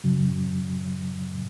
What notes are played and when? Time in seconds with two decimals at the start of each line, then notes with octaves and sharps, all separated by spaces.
0.04 F#2 C#3 F#3